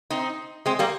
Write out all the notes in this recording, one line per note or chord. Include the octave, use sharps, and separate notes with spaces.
C4 D#4
G#3 C4
G3 A#3